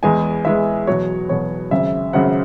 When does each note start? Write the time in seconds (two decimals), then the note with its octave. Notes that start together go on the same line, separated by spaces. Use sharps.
0.03 E2 E3 G#3 G#5
0.45 E2 E3 G#3 E5
0.87 E2 B2 F#3 C#5
1.29 E2 B2 F#3 C#5
1.71 G#1 F#2 C#3 E5
2.13 G#1 F#2 C#3 F#5